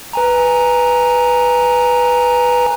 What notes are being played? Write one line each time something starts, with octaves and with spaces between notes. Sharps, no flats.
B4 G#5 A#5